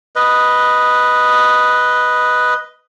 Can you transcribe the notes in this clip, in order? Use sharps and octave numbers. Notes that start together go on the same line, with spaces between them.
B4 D#5